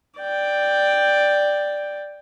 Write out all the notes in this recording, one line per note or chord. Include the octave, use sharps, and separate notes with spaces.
D5 G5